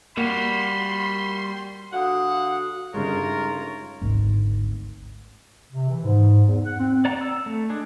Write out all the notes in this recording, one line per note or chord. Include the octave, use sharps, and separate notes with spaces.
G3 A#3 F#4 B5 C6
D3 F#4 F5 F#5 D#6
G1 C#3 G#3 D#4 F4 G4 A#4 C#5
G#1 D2
C3
E3
G#2
E2
F#5
C4
D5 F#5 A#5
E6
A3
G#3 D4 G#4